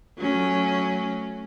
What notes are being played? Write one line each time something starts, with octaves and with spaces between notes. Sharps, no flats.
F#3 A3 C#4